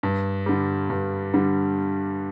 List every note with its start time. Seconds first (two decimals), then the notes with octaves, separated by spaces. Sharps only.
0.03 G2
0.46 D3 G3
0.90 G2
1.34 D3 G3